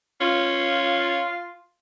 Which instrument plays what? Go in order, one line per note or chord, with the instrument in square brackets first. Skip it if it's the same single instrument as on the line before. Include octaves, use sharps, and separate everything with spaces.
[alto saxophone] C#4 [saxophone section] F4